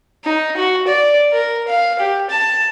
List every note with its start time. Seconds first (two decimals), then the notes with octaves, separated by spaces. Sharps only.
0.24 D#4
0.57 F#4
0.87 D5
1.32 A#4
1.68 F5
1.99 G4
2.30 A5